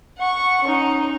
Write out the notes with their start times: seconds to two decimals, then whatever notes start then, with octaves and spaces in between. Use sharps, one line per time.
0.18 F#5 C#6
0.64 C#4 D#4